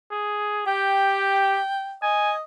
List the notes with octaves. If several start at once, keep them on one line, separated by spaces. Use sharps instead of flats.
G#4
G4 G5
D#5 G#5